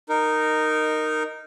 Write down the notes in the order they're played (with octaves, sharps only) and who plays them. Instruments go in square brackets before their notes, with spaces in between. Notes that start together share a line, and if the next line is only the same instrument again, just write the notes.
[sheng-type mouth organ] D#4 A#4